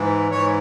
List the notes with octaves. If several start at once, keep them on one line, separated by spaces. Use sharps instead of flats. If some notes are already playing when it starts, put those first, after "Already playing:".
Already playing: G#2 E3
G#2 E3 C#5